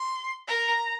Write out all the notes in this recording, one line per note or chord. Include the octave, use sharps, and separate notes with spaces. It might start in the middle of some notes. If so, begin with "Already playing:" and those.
Already playing: C6
A#4 A#5